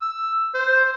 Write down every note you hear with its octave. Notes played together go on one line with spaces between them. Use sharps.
E6
C5